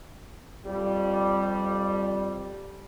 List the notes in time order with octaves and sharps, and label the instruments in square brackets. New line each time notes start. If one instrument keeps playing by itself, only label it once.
[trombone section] F2 F3 G3